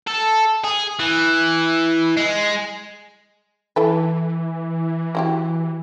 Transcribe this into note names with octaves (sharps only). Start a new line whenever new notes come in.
A4
G#4
E3
G#3
E3 E4 A4 B4
F#3 E4 G4